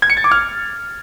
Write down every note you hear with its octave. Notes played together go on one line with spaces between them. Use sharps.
G#6
C#7
A6
D6
F6